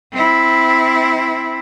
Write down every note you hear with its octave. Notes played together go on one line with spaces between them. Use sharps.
C4 E4